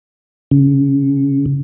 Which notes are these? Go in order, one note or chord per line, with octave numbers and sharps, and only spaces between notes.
C#3